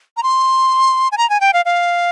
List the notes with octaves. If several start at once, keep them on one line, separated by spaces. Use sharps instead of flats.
A#5
C6
G#5
A#5
G#5
G5
F5
F5